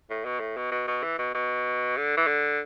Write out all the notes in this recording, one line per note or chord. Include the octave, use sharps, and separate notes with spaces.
A2
B2
A2
B2
B2
B2
E3
B2
B2
D3
E3
D3